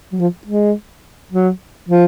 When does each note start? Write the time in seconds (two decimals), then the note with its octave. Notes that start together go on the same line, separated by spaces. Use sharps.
0.12 F#3
0.19 F3
0.47 G#3
1.32 F#3
1.89 F3